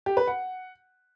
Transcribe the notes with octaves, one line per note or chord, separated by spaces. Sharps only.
G4
B4
F#5